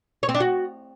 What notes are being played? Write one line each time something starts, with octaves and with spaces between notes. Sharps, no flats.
C#5
C4
D4
F#4